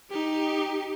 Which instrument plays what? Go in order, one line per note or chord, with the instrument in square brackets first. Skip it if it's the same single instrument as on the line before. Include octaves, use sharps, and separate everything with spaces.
[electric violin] D#4 G4